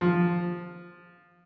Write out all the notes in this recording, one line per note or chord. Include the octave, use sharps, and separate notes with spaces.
F3